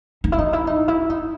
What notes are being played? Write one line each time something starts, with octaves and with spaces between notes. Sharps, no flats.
D#4
E4
D#4
E4
D#4
E4
D#4